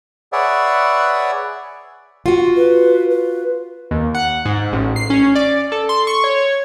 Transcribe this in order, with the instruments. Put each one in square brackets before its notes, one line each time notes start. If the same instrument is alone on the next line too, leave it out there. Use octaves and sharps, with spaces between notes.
[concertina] G#4 B4 C#5 D5 E5 F#5
[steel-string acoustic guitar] F4 F#4
[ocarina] B4
B4
[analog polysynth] D#2
F#5
G#2
A1
C7
C#4
D5
A4
C6
C#6
C#5